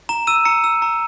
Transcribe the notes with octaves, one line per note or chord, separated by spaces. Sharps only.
A#5 E7
E6 D#7
A#5 C#7
E6
A#5